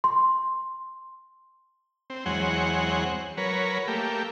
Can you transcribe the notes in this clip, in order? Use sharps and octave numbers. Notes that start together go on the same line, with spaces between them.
C6
C4
E2 F#3 G#3 C4 C#5 F#5
F#3 A#4 B4 C#5
A3 A#3 G4